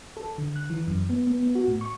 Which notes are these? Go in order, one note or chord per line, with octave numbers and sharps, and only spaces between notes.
A4
D3
F#6
E3
F#2
B3
B3
B3
F#4
A2
C#6